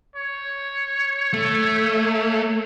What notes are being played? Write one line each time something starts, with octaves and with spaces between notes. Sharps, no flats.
C#5
A3